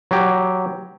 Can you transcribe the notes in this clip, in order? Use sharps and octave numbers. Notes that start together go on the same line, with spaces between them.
F#3 G4